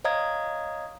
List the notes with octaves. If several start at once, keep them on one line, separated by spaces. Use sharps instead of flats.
C#5 D#5 F5 A#5 D#6 G#6